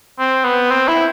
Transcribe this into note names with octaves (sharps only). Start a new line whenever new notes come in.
C4
B3
C4
E4